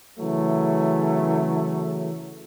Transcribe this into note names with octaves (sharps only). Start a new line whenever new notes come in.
C#3 E3 F#3 A3